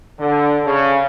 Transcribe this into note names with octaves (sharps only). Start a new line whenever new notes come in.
D3
C#3